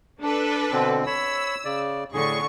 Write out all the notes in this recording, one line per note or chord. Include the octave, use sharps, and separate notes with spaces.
D4 A4 B4
B2 D3 C4
C#5 B5 E6
C#3 D5
A2 D3 G#4 C#6